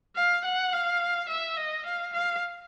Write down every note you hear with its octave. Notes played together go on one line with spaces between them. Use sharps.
F5
F#5
F5
E5
D#5
F5
F5